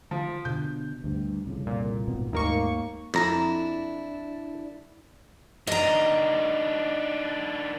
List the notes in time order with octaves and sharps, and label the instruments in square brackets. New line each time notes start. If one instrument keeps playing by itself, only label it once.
[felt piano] F3
[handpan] B2 D3 [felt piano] G6
[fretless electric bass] D2 G2
C2 F2 C#3
[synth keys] A#2
[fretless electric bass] G#1 B2 B3
[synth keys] D#2 A#3 C#6 [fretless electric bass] G#2 F#3 A3
[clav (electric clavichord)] F2 A#5 [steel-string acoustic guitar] D4 E4
[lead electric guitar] D#3 D4 [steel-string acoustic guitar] D#5 A#5